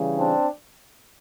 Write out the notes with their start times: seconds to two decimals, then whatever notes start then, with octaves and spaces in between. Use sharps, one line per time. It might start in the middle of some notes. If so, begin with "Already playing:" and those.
Already playing: C#3 E3 G3
0.18 C4 D4